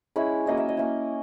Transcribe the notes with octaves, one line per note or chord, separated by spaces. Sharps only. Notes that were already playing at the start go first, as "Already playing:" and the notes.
G#3 C#4 E4 B5
F#3 A#3 C#4 E4 D#5
E5
D#5
A#3 C#4 E4